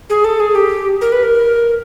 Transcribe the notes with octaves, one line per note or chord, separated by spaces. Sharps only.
G#4
A4
G#4
G4
A#4
B4
A#4